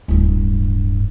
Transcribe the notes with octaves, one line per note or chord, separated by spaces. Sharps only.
D1 G2